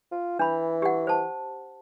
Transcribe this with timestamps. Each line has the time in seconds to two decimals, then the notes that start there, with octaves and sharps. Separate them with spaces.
0.12 F4
0.39 E3 D4 B5
0.82 G4 F#5
1.07 C5 A5